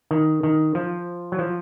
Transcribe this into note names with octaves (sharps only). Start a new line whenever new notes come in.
D#3
D#3
F3
F#3
F3